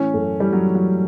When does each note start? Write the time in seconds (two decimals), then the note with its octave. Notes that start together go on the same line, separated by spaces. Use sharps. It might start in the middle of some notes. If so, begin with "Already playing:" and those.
Already playing: A2 E3 C#4
0.14 F#2 A3
0.40 E3 G3
0.53 F#3
0.67 E3
0.75 F#3